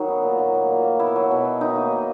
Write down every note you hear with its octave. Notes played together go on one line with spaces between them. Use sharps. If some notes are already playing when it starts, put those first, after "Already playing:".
Already playing: D#3 F#3 D#4
B3
A#2
F#3
A#3
A#2
A#3
B3 E4
F#3
B2
F#3
D#3 D#4
A#3
A#3